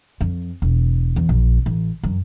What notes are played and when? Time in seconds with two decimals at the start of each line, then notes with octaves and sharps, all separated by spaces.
0.21 F2
0.62 E1
1.16 E2
1.29 A#1
1.66 A1
2.03 F#2